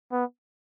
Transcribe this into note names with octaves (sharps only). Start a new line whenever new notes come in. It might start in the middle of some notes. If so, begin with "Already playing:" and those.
B3